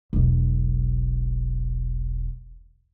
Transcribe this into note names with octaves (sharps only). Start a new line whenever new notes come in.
E1 B1